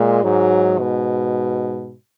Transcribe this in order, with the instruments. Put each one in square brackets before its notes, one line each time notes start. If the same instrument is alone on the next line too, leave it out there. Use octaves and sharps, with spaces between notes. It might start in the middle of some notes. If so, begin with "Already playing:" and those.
Already playing: [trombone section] A#2 [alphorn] G#3
[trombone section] G#2 [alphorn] F#3
[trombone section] G#2 [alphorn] B2